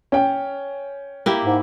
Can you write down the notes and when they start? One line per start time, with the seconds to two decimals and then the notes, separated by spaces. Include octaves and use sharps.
0.12 C#4 G5
1.26 A#3 E4 G4
1.44 G#2